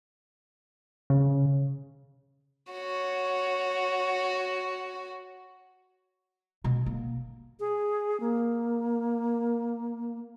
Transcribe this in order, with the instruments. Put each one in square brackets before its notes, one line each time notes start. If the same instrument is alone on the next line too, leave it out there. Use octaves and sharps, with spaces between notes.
[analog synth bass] C#3
[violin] F#4 C#5
[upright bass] B2
A#3
[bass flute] G#4
A#3